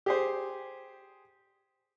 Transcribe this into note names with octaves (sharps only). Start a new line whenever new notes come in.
G4 G#4 C5